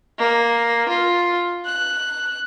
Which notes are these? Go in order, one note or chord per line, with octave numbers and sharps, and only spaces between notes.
A#3
F4
F#6